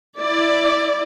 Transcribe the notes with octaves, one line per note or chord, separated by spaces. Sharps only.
E4 D5